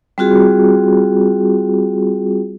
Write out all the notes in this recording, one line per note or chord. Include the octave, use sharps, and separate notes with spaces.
G3 C4 F4 F#4 G#4